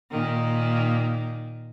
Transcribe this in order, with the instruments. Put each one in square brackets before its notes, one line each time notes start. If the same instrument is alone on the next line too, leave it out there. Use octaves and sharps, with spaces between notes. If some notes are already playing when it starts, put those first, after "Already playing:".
[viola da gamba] A#2 D#3